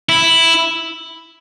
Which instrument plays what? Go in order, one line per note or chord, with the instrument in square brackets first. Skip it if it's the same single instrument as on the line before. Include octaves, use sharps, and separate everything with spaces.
[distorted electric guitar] E4